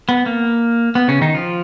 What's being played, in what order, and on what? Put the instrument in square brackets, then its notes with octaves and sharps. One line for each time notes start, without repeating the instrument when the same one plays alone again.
[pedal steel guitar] B3
A#3
B3
C#3 C#4
D#3 D#4
F3 F4